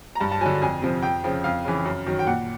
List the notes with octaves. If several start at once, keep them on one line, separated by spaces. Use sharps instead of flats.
A#5
G2 A5
A5
D3 F#3 G#5
F2 G#5
C3 F3
F2 G5
C#3 F3
F2 F5
C#3 E3
F#2
D#3 F#3
G5
A#2 F#5